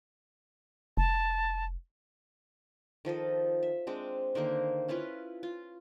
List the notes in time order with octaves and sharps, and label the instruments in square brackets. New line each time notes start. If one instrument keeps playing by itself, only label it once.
[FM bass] F1 [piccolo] A5
[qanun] D#3 F3 A4 D#5
E5
G#3 C4 D4
D3 D#3 A#3 C5
C#4 E4 F4 B4
F4